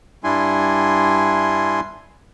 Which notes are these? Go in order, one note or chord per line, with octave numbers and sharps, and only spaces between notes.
G2 G3 D4 E4 G#5 C6